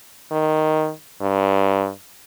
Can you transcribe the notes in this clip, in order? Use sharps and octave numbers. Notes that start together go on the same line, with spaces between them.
D#3
G2